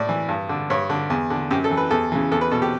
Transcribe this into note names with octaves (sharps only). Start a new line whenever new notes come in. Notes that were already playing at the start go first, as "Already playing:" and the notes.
Already playing: A2 D5
E3
G2
D3
G2 C#5
D3
E2
D3
F#2 G4
A4
E3
B4
E2 A4
C#3 E3
E2 A4
B4
B2 A4
G4